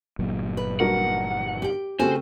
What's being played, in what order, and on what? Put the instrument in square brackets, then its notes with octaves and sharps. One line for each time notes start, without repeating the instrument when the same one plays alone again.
[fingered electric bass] G1 A#2 F#3
[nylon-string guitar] B4
[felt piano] G2 F#4 A#4 [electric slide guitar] F#5
[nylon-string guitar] G4 G5
[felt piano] C#3 A3 C4 [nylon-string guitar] F#4 G4 G#5 [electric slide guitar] C5